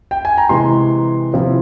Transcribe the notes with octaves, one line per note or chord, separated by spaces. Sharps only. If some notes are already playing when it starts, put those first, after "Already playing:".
G5
G#5
A#5
C3 E3 G#3 C6
C3 F3 C4 E4